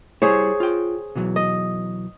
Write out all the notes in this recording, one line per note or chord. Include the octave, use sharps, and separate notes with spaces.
G3 E4 G#4 C5 C#5
F4 G5
B2 E3 F#3
D#5